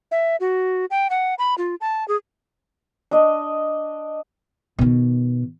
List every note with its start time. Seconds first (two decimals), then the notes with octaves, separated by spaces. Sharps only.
0.11 E5
0.40 F#4
0.91 G5
1.10 F#5
1.39 B5
1.58 F4
1.81 A5
2.08 G#4
3.11 D4 D#5
4.79 B2 D#3